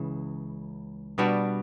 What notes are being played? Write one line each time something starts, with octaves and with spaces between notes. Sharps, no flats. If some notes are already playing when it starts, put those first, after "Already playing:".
Already playing: C#2 C#3 E3
B2 G3 B3 D4 F#4